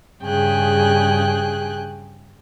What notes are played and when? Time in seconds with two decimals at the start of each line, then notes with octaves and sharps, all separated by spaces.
0.22 G2 C#3 G#4 G5 G#5 F#6